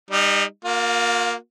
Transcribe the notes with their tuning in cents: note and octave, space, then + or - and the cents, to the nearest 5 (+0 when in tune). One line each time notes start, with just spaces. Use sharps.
G3 +30 D#4 -10
A#3 +0 F4 +40